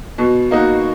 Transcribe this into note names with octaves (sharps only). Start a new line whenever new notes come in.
B2
A#3 D#4 F#4